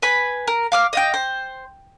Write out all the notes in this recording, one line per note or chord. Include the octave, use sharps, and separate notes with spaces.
B4 G#5 B5
A#4
F5 D6 F6
D#5 F5 G5
C5